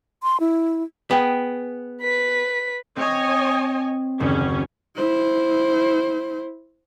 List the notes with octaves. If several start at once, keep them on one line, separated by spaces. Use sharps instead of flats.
C6
E4
B3 G#4 G5
B4 B6
C4 C#5 D#5 G#5
F#1 D#2 C#4
E4 C5